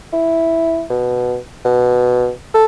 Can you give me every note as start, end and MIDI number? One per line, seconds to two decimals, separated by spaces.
0.13 0.84 64
0.90 1.37 47
1.65 2.30 47
2.54 2.65 69